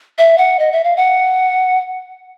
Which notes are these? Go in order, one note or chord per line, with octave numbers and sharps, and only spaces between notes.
E5
F#5
D#5
E5
F5
F#5